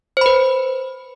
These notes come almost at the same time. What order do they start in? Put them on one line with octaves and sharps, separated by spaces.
C5 B5 B4